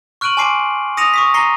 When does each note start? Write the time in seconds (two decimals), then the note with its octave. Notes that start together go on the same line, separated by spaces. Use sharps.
0.21 C#6 F6 F#6 D7 D#7 F#7
0.37 G#5 A5 C6 D6 C7 D7
0.97 D#6 A#6 C#7 D#7 F7
1.14 C#6 D#6 B6
1.34 A#5 A#6 C7 C#7 D#7 G7